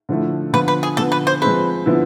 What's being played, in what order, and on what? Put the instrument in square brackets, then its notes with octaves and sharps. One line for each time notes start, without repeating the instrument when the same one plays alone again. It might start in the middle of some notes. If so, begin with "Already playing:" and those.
[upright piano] D3 F3 A3 E4
[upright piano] D3 F3 B3 F4 [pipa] B4
[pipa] B4
G#4
[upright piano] D3 F3 B3 [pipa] A4
[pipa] B4
C5
[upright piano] F3 G#3 C4 [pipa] B4
[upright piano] D3 F3 B3 E4